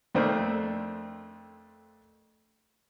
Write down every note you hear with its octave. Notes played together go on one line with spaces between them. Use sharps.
F2 A3 A#3 C4 D4